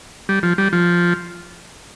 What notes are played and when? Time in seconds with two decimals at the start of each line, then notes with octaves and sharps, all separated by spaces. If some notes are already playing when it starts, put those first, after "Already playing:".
0.29 G3
0.43 F3
0.58 G3
0.73 F3